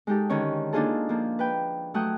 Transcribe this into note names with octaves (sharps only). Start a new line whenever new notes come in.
G#3 D#4 G4 A4
D3 D#3 C#4 C#5
A#3 D4 D#4 F4 G#4 A4
F3 A#3
B4 G5
F#3 A3 F#5 G5 D#6